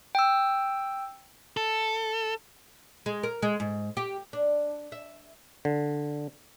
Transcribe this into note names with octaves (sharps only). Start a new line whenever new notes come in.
G5 E6
A4
G#3
A#4
G#3
G#2
G4
D4
E5
D3